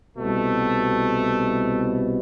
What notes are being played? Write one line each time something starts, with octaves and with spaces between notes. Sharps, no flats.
C2 B2 A3